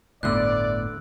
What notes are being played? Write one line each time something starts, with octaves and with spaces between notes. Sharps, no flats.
G1 D2 A2 D3 B3 D5 E6 F#6